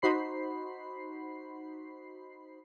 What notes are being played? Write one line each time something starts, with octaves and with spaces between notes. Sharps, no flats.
D#4 F#4 C5 B5 C7